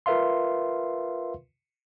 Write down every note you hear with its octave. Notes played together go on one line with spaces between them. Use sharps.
F4 A#4 B4 E5 F5 C6